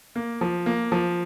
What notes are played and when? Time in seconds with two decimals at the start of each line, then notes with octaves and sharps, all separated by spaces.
0.16 A#3
0.41 F3
0.66 A#3
0.92 F3